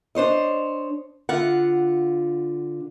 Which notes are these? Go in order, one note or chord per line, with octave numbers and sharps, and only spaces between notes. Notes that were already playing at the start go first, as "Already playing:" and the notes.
D4 C5 C#5 D#5
D3 F4 F#5